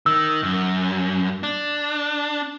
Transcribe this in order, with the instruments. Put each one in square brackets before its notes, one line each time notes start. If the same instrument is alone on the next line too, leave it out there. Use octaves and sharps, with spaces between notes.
[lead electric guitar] D#3 [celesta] E6
[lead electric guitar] F#2
D4